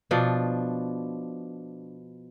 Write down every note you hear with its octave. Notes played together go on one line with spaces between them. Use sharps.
B2 F3 D4